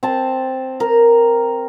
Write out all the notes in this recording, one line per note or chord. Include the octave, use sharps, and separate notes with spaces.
C4 A5
A#4